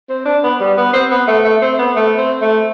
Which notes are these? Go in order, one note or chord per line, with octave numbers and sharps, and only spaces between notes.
C4
D4
B3
G3
B3
C4
B3
A3
A3
C4
B3
A3
C4
A3